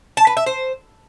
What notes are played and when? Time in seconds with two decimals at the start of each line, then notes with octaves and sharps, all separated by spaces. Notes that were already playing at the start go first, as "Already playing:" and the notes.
0.17 A5
0.27 B4
0.37 E5
0.46 C5